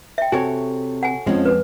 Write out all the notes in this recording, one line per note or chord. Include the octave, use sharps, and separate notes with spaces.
E5 G5
C3 F#4 A4 C#5 G#5
F#5 G#5
F2 F3 G#3 C4 C#4
B4